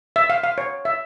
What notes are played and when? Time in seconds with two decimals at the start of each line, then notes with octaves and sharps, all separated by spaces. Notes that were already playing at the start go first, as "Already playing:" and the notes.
0.16 E5
0.30 F5
0.44 F5
0.58 C#5
0.85 E5